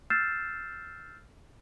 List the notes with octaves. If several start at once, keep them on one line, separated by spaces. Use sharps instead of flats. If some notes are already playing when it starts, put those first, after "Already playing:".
E6 F6 G6 A6 C7 E7